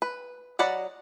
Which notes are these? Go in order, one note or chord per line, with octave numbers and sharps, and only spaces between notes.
B4
F#3 D5 D#5 F#5 B5